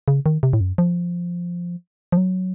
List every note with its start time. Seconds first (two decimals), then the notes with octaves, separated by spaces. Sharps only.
0.08 C#3
0.26 D#3
0.43 C3
0.53 A2
0.60 F#2
0.78 F3
2.12 F3
2.17 F#3